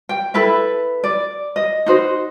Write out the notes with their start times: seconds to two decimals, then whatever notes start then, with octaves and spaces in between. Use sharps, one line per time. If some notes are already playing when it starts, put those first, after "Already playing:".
0.09 G5
0.34 E4 A4 B4 E5
1.04 D5
1.56 D#5
1.86 D#4 F#4 C5